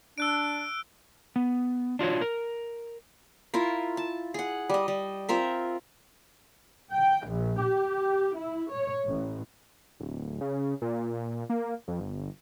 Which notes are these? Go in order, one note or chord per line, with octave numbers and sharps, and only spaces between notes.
D4 E6 F#6 D7
B3
D4 F4 F#4 C#5
A#4
E4 F4 A#4
A5
G#4 F#5
G3 D#5
G3
C4 F4 A#4 E5
G5
A#1
G4
E4
C#5
A1
D1
C#3
A#2
A#3
F2
G1